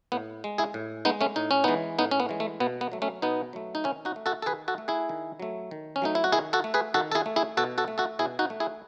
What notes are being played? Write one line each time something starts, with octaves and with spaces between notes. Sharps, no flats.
A2 B3
G#3
E4 G#4
A2
G#3 B3 D#4
A3 C#4
A2 D#4
C#4
E3 G#3 B3 D#4
A2 B3 D#4
C#4
B3
E3 G#3
A3
B2 B3
B3
F#3 A3
A3 C#4
B2 B3 D#4
F#3 A3
D#4
D#3 C#4 E4
D#4 F#4
A3
F#4 A4
A4
D#3 G#4 B4
F#4 A4
A3
E4 G#4
D#3
F#3 A3
D#3
C#4
F#3 A3 D#4
E4
F#4
D#3 E4 G#4
F#4 A4
A3
G#4 B4
D#3 F#4 A4
A4
E4 G#4
A3
E4 G#4
B2 F#4 A4
F#4 A4
A3
F#4 A4
B2 E4 G#4
D#4 F#4
A3
E4 G#4